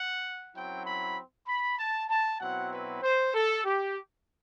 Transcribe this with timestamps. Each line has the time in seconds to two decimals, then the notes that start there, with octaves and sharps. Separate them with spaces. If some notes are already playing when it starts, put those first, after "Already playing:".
Already playing: F#5
0.55 F#2 F#3 C4 E4 G5
0.85 B5
1.47 B5
1.79 A5
2.10 A5
2.40 B2 F#3 C4 E4 F#5
2.72 B4
3.03 C5
3.34 A4
3.65 G4